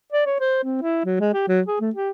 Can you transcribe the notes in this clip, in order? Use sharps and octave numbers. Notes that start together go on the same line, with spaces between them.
D5
C#5
C5
C4
E4
F#3
G#3
G4
F#3
G#4
A3
G4